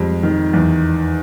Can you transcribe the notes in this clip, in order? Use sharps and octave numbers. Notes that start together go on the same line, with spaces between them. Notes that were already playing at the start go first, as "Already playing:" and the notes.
Already playing: F2 G3 G#3
D#3
E2